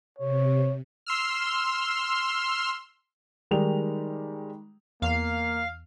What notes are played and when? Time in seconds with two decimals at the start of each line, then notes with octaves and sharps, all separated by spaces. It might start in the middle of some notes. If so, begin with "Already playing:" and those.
0.19 C3 C#5
1.06 C6 E6 F6
3.51 D#3 G3 G#3 D#4 G4 F7
5.02 E2 A#3 F5 C7